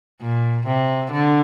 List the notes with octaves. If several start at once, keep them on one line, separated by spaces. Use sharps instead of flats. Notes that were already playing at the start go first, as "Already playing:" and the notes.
A#2
C3
D3